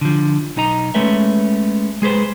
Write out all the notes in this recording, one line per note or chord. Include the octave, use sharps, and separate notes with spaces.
D3 F3
B1 D#4 D#5 A#5
G#3 A3 C#4 B4 E5
G#3 G#4 B4 C5